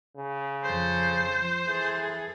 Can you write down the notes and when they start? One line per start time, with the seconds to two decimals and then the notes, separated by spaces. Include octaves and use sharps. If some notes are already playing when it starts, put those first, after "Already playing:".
0.17 C#3
0.64 F2 A4 C5
1.36 F3
1.68 E3 G#4 A4